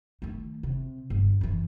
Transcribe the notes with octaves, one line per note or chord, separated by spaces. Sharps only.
D#3 A3
C3
G1
F#2 E3